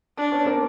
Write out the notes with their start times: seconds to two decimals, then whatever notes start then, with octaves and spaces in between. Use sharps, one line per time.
0.17 D4
0.32 B3 C#4
0.45 A#3 C4